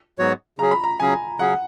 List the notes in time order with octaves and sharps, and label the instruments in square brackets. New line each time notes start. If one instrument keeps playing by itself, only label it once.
[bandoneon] G#2 F#3 B3 F#4 C#5
[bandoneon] C#3 F#3 C#4 G#4 [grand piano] A#5
[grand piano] B5
A#5
[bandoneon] C#3 F#3 C#4 G#4 [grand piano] G#5
[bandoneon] C#3 F#3 C#4 G#4 [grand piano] F#5